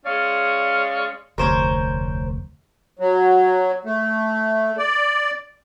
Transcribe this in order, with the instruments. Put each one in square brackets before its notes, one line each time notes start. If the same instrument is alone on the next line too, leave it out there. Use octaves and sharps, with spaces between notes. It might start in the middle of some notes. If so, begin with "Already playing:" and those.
[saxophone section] G#3 C#4 C#5 D5 F5
[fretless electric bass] F1 D2 [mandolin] A#4 C5 C#5
[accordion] F#3
A3
D5